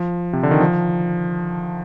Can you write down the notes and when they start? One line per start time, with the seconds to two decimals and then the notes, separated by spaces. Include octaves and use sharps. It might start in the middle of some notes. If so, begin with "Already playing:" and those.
Already playing: F3
0.33 C3
0.43 D3
0.51 D#3
0.61 F3